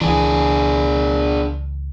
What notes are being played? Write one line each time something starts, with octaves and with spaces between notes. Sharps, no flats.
C#2 E3 D4 G#4